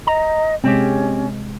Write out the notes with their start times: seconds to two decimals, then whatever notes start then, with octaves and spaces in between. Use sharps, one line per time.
0.07 D#5 A#5
0.64 C3 G#3 C4 C#4 G4